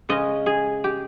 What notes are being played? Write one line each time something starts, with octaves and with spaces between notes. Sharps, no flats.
C#3 G#3 C#4 D#5
G#4
G4